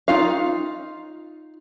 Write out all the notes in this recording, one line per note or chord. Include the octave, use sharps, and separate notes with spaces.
D#4 F4 F5